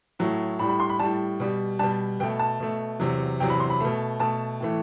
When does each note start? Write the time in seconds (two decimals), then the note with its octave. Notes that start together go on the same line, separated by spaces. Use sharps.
0.19 A2 F#3 A3
0.59 A2 B5
0.64 G3
0.69 B5
0.80 C6
0.90 B5
0.99 A2 G3 A5
1.40 B2 G3
1.79 B2 G3 A5
2.20 B2 G5
2.23 A3
2.39 A5
2.60 B2 A3
3.00 E2 C3 F#3
3.40 E2 C3 F#3 G5
3.50 B5
3.60 C6
3.70 B5
3.81 B2 A3
4.19 B2 A3 A5
4.60 A2 E3 A3